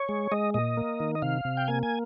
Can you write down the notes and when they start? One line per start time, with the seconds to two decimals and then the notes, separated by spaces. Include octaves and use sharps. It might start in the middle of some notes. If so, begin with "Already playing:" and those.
Already playing: C#5
0.09 G#3
0.32 G#3 D#5
0.54 A#2 D#5
0.77 A#3
1.00 D#3
1.15 D#5
1.22 C3 F5
1.45 C3
1.57 G5
1.68 A#3 G#5
1.83 G#5